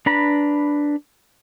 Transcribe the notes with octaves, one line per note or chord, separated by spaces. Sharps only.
D4 B4 A#5 B5